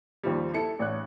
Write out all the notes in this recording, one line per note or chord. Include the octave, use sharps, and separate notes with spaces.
D#2 F3 G3
E4 A4 C#7
A1 C#5 F#6